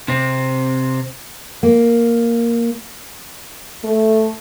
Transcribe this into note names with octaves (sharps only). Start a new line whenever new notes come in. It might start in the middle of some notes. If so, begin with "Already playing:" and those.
C3 C4
A#3
A3